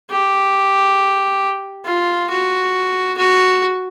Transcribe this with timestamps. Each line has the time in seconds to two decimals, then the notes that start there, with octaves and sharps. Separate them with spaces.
0.10 G4
1.85 F4
2.30 F#4
3.17 F#4